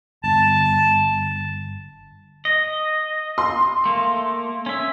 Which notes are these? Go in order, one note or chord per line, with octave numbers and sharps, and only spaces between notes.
G1 A5
D#5
C6
A3 A#3
C#4 E5